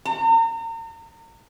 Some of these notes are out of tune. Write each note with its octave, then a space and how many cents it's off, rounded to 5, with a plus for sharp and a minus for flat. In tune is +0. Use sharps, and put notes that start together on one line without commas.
A#5 -35